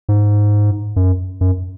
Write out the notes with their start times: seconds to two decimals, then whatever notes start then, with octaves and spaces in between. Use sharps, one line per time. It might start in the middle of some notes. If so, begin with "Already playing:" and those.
0.09 G#2
0.96 F#2
1.41 F#2